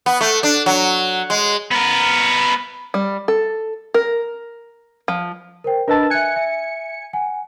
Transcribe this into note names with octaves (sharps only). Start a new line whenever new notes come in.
B3
A3
D4
F#3
G#3
B3 A#4
G3
A4
A#4
F3
A#4 C5 G5
D4 A#4 B4 D#5 A5 E6
E5 G#5 F#6 C#7
E5
F#5 G#5